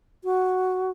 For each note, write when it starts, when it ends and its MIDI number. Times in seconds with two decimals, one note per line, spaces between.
0.24 0.91 66